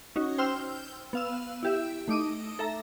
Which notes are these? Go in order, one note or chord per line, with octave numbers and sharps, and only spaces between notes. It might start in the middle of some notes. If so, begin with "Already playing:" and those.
C#4 D#4 F#4
C5 G5 C6 E6 F6
B3 F5 E6
E4 G4 E5
A3 D#4 D6 D#6
A4 E5 A#5